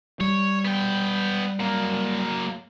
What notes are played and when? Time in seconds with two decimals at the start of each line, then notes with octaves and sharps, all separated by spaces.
0.21 G3 C#5
0.65 B3 G5
1.60 F#3 A#3